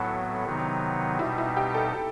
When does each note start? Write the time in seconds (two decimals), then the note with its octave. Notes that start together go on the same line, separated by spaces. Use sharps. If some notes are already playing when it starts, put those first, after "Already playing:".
Already playing: A2 F#3 B3 E4 F#4 A4
0.45 C3 D#3 F#3 B3 D#4
1.19 B2 G3 D#4 E4
1.38 E4
1.57 G4
1.74 A4